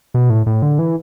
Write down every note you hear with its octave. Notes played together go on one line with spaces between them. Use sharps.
B2
A2
A2
D3
E3